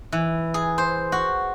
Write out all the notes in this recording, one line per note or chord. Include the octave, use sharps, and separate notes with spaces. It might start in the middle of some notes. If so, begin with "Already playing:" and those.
E3
G#4
C5
F#4